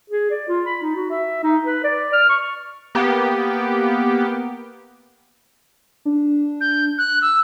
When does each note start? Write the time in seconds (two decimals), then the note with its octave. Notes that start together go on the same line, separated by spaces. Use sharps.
0.10 G#4
0.31 D5
0.48 F4
0.66 B5
0.82 D#4
0.96 F#4
1.11 E5
1.44 D#4
1.65 B4
1.84 D5
2.13 F6
2.29 C#6
2.95 A#3 B3 G4
6.05 D4
6.61 G6
6.98 F#6
7.22 E6